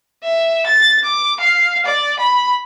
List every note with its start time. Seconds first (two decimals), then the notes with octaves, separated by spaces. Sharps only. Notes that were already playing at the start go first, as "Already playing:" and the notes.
0.24 E5
0.66 A6
1.04 D6
1.40 F5
1.85 D5
2.19 B5